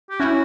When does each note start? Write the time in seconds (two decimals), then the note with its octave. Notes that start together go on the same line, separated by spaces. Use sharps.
0.10 G4
0.19 C#4 E4 F#4